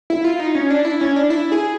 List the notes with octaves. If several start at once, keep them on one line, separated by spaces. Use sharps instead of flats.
E4
F4
D#4
C#4
D4
E4
C#4
D4
E4
G#4